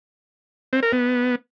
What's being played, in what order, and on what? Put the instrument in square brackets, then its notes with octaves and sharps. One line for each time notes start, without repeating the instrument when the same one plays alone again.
[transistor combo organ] C4
A#4
B3